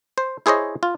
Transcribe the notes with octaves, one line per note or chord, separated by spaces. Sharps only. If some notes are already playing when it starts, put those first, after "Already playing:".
C5
E4 G#4 C5 C#5 D#5
F4